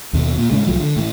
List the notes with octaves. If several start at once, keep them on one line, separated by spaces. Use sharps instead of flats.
D#2 B2
A#2
A2 C#3 G#3
C2 A2 F3 F#3
D3
A2 E3